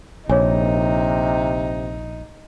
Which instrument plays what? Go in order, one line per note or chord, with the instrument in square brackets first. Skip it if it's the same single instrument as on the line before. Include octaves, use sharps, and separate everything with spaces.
[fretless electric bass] A#1 [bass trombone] C3 [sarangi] D#4 [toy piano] G#4 C#5 G#5